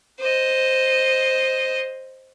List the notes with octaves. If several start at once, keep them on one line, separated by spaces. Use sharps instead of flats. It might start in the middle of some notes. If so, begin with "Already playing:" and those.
C5 D#5